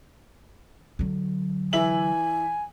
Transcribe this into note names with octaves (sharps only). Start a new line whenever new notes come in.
D3 F#3
E3 E5 G#5 F#7